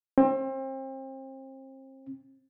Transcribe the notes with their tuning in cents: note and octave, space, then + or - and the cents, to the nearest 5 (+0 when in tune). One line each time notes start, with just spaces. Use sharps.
C4 +35